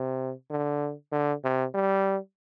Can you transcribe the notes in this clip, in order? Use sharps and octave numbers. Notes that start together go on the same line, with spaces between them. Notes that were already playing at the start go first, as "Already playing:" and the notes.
Already playing: C3
D3
D3
C3
G3